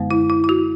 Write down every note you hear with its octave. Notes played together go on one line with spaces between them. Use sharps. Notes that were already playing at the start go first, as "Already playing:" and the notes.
Already playing: F#2 D3 G#3 B3
E4
E4
E4
F#4